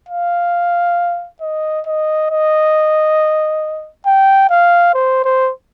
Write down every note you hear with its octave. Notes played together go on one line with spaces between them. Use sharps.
F5
D#5
D#5
D#5
G5
F5
C5
C5